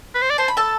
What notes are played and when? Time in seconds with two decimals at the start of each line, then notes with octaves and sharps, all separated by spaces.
0.14 B4
0.22 C5
0.30 D5
0.38 C5 A5
0.48 B5
0.57 A4 A5